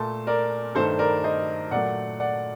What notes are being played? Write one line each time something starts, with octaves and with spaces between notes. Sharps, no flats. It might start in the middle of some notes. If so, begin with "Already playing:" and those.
Already playing: A#2 A3 A5 C6
A#4 D5
G2 D#3 A3 A4 C5
A#4 D5
C5 D#5
A#2 F#3 A3 D5 F#5
D5 F#5